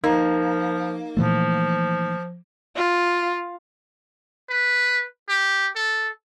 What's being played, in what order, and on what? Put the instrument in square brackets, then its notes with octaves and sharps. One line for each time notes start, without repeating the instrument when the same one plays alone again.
[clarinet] F3 [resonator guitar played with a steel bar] A#3 [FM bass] D#4
[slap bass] A#2 E3 A3 [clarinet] F3
[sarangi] F4
[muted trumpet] B4
G4
A4